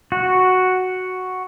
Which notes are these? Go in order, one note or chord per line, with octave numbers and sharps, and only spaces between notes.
F#4